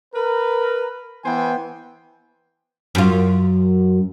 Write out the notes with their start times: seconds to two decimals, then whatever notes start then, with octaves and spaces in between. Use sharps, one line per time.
0.15 A#4 B4
1.24 E3 B3 C5 G5 G#5
2.95 F#2 F4